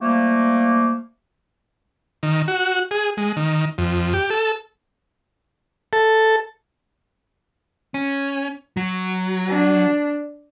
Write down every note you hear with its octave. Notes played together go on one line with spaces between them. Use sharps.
F3 G3 A3 A#3
D#3
F#4
G#4
G#3
D#3
F2
G4
A4
A4
C#4
F#3
D4